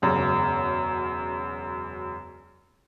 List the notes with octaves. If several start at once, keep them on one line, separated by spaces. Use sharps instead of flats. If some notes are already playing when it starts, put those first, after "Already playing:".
E1 F#2 C#3